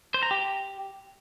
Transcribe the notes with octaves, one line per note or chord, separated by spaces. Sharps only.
C5
A#5
G4